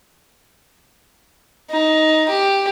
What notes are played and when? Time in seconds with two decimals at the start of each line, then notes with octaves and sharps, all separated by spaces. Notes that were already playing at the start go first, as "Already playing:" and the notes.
1.70 D#4
2.29 G4